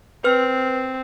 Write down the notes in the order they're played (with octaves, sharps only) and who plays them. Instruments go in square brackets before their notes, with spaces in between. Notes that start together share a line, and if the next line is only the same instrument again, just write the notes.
[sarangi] C4 [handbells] B4 F6